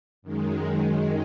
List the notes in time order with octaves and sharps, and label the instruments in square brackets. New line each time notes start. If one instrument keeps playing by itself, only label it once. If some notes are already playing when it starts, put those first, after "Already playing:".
[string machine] F#2 D#3 G#3